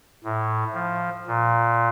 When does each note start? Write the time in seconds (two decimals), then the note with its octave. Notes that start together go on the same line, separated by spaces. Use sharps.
0.24 A2
0.73 F3
1.27 A#2